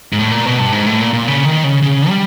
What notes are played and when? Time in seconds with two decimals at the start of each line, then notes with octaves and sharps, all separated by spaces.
0.13 G#2
0.19 A2
0.32 A#2
0.46 B2
0.59 G2
0.72 G#2
0.86 A2
1.01 A#2
1.13 A#2
1.28 C#3
1.45 D#3
1.64 C#3
1.82 C#3
2.09 G3